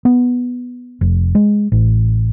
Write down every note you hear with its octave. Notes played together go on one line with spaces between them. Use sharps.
B3
F1
G#3
A1